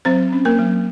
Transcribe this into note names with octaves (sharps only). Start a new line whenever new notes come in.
F#3 C4 C5
C#4
A#3 A#4
F#3